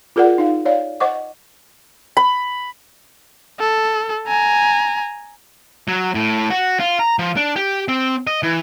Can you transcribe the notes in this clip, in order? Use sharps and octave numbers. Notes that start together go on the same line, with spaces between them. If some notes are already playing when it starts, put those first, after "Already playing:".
F4 G#4 A#4 D5 F#5
D#4 F5
C#5 D5 F5
C5 D#5 F#5 C#6 D6
B5
A4
G#5 A#5
F#3
A2
F#4
F4
A#5
F3
D4
G4
C4
D#5
E3